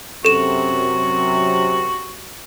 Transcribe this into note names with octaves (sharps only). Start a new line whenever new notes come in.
F#2 C3 F#4 A4 E7